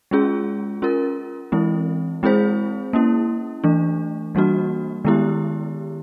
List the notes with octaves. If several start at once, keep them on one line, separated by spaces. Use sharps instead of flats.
G#3 C#4 F4 G#4
C#4 F4 A#4
E3 G#3 C4 E4
G#3 C4 E4 G#4 C5
A#3 C#4 E4
E3 A3 D4
E3 G3 A#3 D4 F#4
D#3 G#3 B3 E4 G4